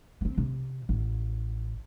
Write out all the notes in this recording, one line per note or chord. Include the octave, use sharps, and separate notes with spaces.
B3 C4
C3
A1